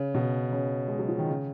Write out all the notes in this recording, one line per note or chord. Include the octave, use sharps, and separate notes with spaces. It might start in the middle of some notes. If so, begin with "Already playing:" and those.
Already playing: C#3
B2
C#3
G#3
F#3
F3
D#3
C#3